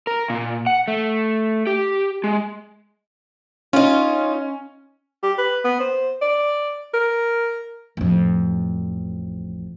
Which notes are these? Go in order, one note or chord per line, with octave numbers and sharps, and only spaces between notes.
A#4
A#2
F#5
A3
G4
G#3
C#4 D#4 F4
G4
B4
B3
C5
D5
A#4
A1 F2